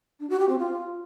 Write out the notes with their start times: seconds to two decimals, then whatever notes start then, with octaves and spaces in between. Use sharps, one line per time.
0.20 D4
0.30 F#4
0.39 G4
0.49 C4
0.59 F4